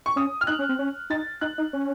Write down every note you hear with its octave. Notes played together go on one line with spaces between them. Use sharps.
C#6
C#4 D#6
F6
D#4 F#6
C#4
C4
C#4
D#4 A6
D#4 F#6
D#4
C#4